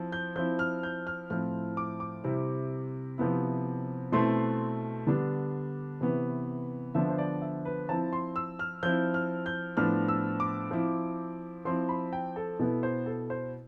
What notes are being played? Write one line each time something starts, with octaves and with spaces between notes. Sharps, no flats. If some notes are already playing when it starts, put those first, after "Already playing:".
Already playing: F3 C4 E4
G6
F3 C4 E4 G6
F6
G6
F6
A2 F3 C4 E4 F6
D6
D6
C3 G3 C4 E4
C3 F3 B3 E4
B2 A3 C4 E4 C6
D3 G3 B3 D4
C3 E3 B3
D3 F3 B3 D4 E5
C5
D5
E5
B4
F3 C4 E4 A5
C6
E6
F6
F3 C4 E4 G6
F6
G6
A2 F3 B3 D4 F6
E6
D6
F3 C4 E4
F3 C4 E4 C6
B5
G5
A4
B2 B3 E4 A4
C5
A4
C5